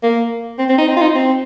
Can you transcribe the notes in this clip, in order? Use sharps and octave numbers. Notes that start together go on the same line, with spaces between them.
A#3
C4
C4
D#4
C4
F4
D#4
C4